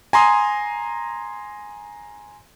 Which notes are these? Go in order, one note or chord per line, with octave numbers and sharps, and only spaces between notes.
G#5 A#5 C6 D#6